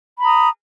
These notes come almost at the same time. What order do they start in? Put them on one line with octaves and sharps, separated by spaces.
B5 A#5 D#6